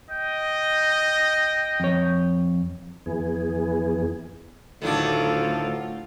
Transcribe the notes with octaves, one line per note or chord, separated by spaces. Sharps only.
D#5 G5
F2 C#5
F2 E3 B3 G#4
D2 A2 D#3 F#3 D4 F4 A4